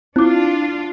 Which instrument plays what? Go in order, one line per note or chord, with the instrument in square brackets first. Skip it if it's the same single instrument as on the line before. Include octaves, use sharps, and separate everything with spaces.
[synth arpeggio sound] C4 [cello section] D4 F4 [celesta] E4 D6